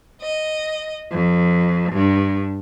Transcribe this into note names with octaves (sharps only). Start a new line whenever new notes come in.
D#5
F2
G2